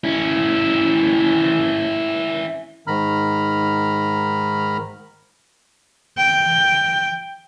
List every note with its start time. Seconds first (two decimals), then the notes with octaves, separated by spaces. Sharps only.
0.04 C#4 E4
2.87 G#2 D#3 A#5 B5 F6
6.18 G5